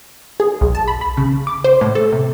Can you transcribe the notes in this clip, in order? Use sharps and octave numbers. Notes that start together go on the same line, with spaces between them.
G#4
B1
A5
B5
B5
C#3
D6
C5
A2
A4
C3